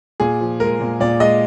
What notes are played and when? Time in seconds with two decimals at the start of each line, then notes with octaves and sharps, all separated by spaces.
0.20 A#2 G#4
0.41 F3
0.60 G#3 A#4
0.81 A#2
1.00 A#2 D5
1.20 G#3 D#5